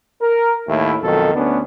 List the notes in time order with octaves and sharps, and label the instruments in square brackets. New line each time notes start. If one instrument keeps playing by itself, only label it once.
[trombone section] A#4
D#2 A2 E4
B1 F2 D#3 A4
D2 B3 C#4 D4